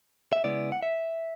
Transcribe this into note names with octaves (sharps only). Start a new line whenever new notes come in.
E5
C#3 G#3 B3 E4 D5
F#5
E5